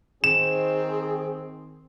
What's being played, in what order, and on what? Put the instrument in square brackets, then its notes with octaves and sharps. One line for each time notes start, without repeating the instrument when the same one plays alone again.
[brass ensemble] D#3 C4 [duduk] G#4 [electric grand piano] E7